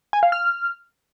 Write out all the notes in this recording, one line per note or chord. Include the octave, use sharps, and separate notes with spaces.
G#5
F5
F6